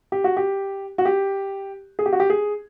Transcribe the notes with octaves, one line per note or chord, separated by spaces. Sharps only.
G4
F#4
G4
F#4
G4
G#4
G4
F#4
G4
G#4